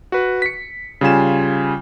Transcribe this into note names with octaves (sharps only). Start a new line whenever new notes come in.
F#4 B4
B6 C#7
C#3 G3 F4 G#5 E7